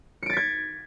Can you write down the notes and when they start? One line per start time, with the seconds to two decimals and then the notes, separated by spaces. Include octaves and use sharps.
0.23 C#7
0.26 D7
0.30 A6
0.33 B6
0.37 G#6